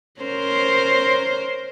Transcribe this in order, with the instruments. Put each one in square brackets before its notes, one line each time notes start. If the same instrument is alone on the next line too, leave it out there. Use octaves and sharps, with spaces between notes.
[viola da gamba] C#4 A#4 C5